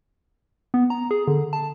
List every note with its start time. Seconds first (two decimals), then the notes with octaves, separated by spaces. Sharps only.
0.74 B3
0.90 A#5
1.11 G#4
1.28 D3
1.53 A5